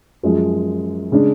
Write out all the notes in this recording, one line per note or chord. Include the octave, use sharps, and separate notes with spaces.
F#2 F3 G#3
C#3 G#3 D4